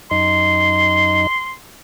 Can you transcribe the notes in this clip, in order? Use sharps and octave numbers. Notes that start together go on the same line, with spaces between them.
F#2 D#4 C6